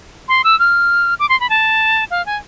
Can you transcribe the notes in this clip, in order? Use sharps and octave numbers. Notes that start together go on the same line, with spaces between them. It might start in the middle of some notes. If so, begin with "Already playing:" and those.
C6
E6
F6
D6
C6
B5
A5
F5
G#5